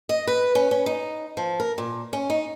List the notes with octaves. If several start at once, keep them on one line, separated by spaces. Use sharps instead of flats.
D#5
B4
C#4
C#4
D#4
F3
A#4
A#2
C#4
D#4